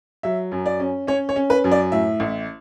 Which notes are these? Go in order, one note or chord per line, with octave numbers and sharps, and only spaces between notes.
F#3 E5
F#2
D5
C#4
C#4 C#5
C#5
C#4
B4
F#2
D5
A2 E5
A1